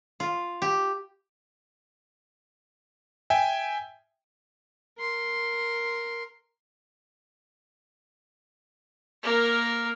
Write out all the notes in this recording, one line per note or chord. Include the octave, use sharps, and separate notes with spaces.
F4
G4
E5 G5 G#5
A#4 C6
A#3 A#4